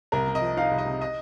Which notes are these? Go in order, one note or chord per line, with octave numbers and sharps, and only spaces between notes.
C2 A#4
C3
D#5
F3
D#4 F5
C2
D#5
C3
D#5